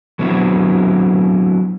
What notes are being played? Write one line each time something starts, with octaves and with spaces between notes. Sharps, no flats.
F#3 B3 C4 D4 E4